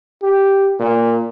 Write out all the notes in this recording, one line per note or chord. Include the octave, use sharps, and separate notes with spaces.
G4
A#2